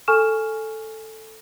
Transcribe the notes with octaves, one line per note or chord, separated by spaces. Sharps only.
A4 G#5 C#6 F6 E7